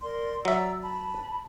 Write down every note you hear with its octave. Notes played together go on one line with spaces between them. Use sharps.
A#4 D5 C6
F#3 D5 E5 A#5 E6
A5 B5